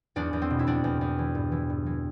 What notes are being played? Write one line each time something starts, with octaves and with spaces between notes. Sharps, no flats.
E2 D4
E2
C4
B2
E4
E2 D4
E2
E2
E3
G2
E3
G2
E3